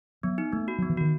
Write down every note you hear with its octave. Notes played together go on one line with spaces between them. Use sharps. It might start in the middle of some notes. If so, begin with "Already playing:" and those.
F#3 B3
D#4
A3 B3
F#4
F#3 B3
E3
D#3 F#4